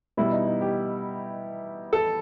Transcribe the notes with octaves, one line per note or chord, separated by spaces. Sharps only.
B2 G3 B3 E4
D#4
D#4
G4
A4